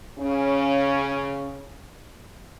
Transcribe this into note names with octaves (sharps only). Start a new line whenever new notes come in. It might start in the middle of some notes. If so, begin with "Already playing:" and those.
C#3 C#4